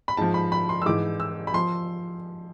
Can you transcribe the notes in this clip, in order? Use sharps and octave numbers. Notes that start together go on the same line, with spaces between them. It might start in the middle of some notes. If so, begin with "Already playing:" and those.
B5
G#2 F3 A5
B5
B5
C6
E6
G#2 E3 D6
E6
B5
F3 C6